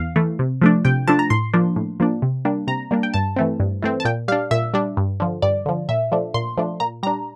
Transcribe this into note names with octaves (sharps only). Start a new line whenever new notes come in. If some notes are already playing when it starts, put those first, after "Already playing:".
Already playing: E2 F5
E3 A3
C3
F3 A3 D4
C3 G5
F3 A3 D4 A5
A#5
A2 C6
F3 A#3 D4
A2
F3 A#3 D4
C3
G3 A#3 D4
C3 A#5
G3 A#3 D4
G5
G2 A5
E3 A3 C4
G2
E3 A3 C4
A5
A#2 G5
G3 D4 F5
A#2 E5
G3 D4
G2
D3 F3
G2 D5
D3 F3
A#2 E5
F3 A3 D4
A#2 C6
F3 A3 D4
A#2 A#5
G3 D4 A#5